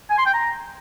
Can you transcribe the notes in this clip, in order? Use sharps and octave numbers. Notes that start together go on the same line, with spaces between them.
G#5
C6
G5
A#5